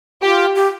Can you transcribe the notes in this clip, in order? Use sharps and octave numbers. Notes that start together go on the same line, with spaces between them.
F4 G4
G4